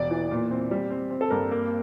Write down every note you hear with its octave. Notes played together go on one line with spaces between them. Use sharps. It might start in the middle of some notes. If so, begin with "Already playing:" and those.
Already playing: E1 D5
E3
A#2
C4
G3
C4
C4
A4
G2 A#4
A#3